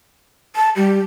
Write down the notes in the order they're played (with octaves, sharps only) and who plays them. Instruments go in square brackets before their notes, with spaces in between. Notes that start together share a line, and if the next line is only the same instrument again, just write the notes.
[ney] A5
[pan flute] G3 [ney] G4